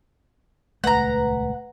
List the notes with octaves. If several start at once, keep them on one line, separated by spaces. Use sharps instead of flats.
D#1 C#2 A3 B4 F#5 A#5